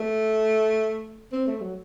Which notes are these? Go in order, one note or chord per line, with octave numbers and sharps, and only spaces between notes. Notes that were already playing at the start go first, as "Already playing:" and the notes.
Already playing: A3
C4
A3
F#3